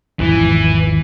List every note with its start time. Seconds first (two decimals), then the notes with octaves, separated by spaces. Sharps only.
0.19 G#1 E2 E3 F3